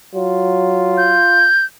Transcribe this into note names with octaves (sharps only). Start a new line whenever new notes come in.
F#3 F4
G6